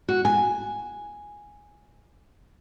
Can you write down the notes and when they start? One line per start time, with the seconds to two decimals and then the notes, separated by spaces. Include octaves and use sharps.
0.09 F#4
0.25 G#5